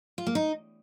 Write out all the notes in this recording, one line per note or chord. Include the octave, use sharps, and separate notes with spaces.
F4
A#3
D#4